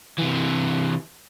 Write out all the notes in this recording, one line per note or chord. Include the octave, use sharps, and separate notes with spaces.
C3 E3